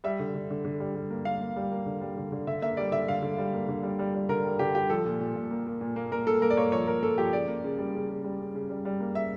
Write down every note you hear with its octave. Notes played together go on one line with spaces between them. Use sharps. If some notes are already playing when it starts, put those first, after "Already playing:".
G3 E5
D3
D3
D3
D3
G3
G3
A#3
A#3 F5
A#3
G3
A#3
D3
G3
D3
D3
D3 E5
A#3 E5
G3 D5
D3 E5
D3 F5
D3
G3
A#3
D3
G3
G3
G3
D3 A#4
G3
D3 G4
G3 G4
F3 A4
A#2
A#2
A#2
A#3
A#3
A#2
A#3
A#2 A#4
A#2 A4
A#3 A#4
D5
A#3 C#5
F3 C#5
A#3 A#4
A#3 A4
F3 G4
C#3 D5
A#3
C#3
G3
C#3
C#3
G3
C#3
C#3
G3
G3
A#3
C#3 E5